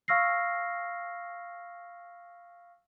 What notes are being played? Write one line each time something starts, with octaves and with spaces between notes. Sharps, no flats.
F5 C#6 E6 F6 A#6 C7